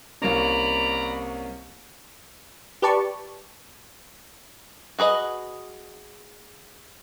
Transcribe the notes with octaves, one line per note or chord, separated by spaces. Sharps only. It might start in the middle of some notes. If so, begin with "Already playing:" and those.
C2 A#3 C#4 D5 A#5 B5
G4 B4 D5 A5 C#6
F#4 G#4 B4 D#5